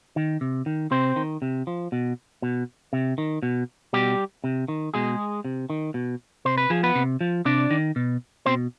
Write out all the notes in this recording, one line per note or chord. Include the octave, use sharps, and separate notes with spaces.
D#3
C3
D#3
C3 C4 C5
D#3
C3
F3
B2
B2
C3
D#3
B2
B2 G3 G4
C3
D#3
B2 G#3 G#4
C3
D#3
B2
C3 C5
B4
F3 G#4
B3 B4
C3
F3
C3 D4 D5
D#3
B2
B2 C4 C5